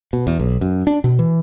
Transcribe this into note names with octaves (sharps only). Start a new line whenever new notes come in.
B2
E2
B1
F#2
D4
B2
E3